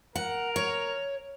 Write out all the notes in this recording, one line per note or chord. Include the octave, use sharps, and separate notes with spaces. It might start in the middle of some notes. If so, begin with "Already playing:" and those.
A#4 F#5
C#5